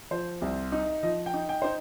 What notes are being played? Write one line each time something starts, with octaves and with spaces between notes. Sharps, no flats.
F3 C5
C2
D#4
F3 D#5
G5
D#4
G5
D#4 C5